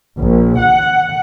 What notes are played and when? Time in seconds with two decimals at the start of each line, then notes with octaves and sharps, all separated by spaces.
0.18 A#1
0.60 F#5